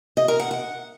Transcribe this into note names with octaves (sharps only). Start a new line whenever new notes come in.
D#5
A#4
F#5
F#5